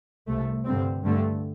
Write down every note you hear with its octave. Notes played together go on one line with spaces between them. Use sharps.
C2 C3 A3
G2 D3 G3 C4
G2 D3 A3